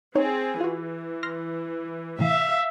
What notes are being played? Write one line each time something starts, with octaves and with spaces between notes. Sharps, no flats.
C4 D#4 G#4 C#5
E3 F4 F#4
C6 F6 A#6
A2 C3 E3 E5 F5